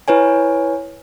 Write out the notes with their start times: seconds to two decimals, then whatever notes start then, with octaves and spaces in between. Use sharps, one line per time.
0.08 E4 B4 C#5 G#5